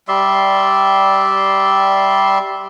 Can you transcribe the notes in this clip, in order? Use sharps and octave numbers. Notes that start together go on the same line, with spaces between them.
G3 D5 E5 C6